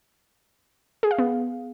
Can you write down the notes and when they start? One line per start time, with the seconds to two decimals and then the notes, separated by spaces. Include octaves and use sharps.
1.03 G#4
1.11 F5
1.19 B3